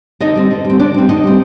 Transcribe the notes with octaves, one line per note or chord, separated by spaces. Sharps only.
D3 D#4 D#5
G3 C4
D3
G3
C4
D3 D4 D5
G3 C4
D3 D#4 D#5
G3 C4